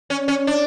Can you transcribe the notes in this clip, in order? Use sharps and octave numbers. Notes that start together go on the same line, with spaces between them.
C#4
C#4
D4